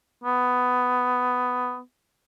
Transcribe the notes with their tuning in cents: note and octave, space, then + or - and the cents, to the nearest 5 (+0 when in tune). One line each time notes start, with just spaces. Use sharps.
B3 +10